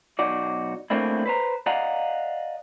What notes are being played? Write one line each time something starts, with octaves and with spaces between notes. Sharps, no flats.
B1 D#4 F#4 D5
A3 A#3 C4 D4 E4
B4 C5 A#5
D5 D#5 F5 F#5 A#5